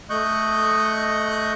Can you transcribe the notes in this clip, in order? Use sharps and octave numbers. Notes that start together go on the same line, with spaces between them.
A3 D#5 C#6 F#6 G6